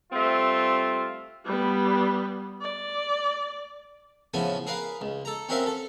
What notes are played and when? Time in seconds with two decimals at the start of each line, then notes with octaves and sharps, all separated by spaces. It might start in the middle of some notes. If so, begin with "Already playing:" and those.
0.12 G3 A3 C4 F4
1.45 G3 B3
2.62 D5
4.34 A2 C#3 F3 B3 G#5
4.67 G#4 A#4 B4 F5
5.01 C#2
5.25 A4 A#5
5.49 C4 C#4 F#4 A#4 E5 F5
5.66 A4